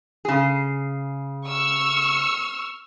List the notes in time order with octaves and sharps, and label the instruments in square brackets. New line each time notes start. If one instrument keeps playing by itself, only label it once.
[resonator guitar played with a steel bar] C#3 G#4
[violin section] C#6 E6 F6